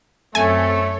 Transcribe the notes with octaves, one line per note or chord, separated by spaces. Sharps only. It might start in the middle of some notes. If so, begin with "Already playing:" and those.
F#2 A3 C4 A4 C#5 G#5